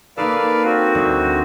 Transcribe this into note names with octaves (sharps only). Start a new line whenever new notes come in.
A#3 D#4 A4 B4 D5 F5
C4 F#4
D2 G3